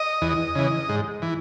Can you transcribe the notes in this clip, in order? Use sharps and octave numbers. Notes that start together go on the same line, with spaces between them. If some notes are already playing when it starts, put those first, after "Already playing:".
Already playing: D#5
E2
C#3 E3
G#2
E3